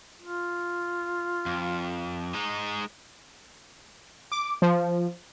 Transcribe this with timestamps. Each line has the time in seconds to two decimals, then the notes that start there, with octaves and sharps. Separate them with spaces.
0.21 F4
1.46 F2
2.34 G#3 D#4
4.32 D6
4.62 F3